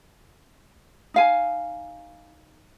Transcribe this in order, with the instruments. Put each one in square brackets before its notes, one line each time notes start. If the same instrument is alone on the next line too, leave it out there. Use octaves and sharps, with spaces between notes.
[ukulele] D#4 F5 G#5